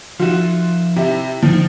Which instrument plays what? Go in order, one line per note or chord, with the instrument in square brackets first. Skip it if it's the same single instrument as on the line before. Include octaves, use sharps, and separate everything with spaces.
[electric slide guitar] F3 D#4 E5 [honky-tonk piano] F4 F#4
[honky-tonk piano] C3 E4
[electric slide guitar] D3 D#4 [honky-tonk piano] F3